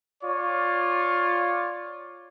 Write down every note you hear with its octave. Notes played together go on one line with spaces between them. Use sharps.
F4 C#5 D5